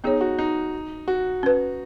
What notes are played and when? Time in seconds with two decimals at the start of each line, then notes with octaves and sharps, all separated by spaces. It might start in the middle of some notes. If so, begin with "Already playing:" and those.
0.04 B3 D#4 G#4 C#5
0.21 F#4
0.38 D#4
1.08 F#4
1.43 C#4 B4